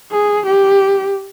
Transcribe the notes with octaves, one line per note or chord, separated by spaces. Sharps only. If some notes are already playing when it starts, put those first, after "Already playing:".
G#4
G4